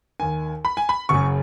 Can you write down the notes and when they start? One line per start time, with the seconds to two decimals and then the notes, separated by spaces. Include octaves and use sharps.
0.20 D#2 D#3 G#5
0.65 B5
0.77 G#5
0.89 B5
1.09 F#1 F#2 C#3 C#6